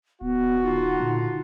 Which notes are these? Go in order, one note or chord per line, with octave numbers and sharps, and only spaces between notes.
D1 B3 F#4
D3 D#4 F4
A#2